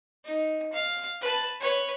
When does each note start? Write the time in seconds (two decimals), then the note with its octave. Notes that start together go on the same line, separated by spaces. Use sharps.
0.25 D#4
0.73 F5
1.21 B4 A5
1.60 B4 C#5